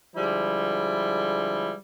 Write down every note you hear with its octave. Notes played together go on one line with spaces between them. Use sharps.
D3 F3 G3 G#3 E4